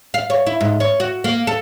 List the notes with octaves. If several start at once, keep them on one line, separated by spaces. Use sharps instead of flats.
F5
C#5
E4
G#2
C#4
F#4
A#3
A4